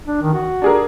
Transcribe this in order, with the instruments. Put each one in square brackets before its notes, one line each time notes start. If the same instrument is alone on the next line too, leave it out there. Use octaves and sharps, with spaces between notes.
[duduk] D4
D#3
F#4
[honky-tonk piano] D4 G#4 A#4